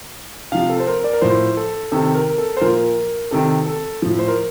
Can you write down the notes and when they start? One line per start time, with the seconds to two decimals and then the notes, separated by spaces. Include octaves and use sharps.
0.52 C3 F3 F5
0.70 A4
0.80 C5
0.87 A#4
1.04 D5
1.13 A#4
1.21 A2 F3 C5
1.57 A4
1.92 C3 D#3 A4
2.15 A#4
2.38 A4
2.57 C5
2.61 A#2 F3 A#4
3.31 C3 D#3 A4
3.66 A4
4.02 A2 F3
4.19 C5
4.28 A#4